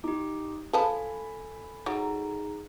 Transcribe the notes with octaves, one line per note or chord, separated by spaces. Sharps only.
D#4 G4 D6
F3 A4 B4 G#5 A5 B5
F#3 D#4 G#4 A#5